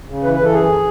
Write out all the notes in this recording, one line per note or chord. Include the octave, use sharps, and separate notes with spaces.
C#3
E3 B4
B4
E3 A4
F#2 G#4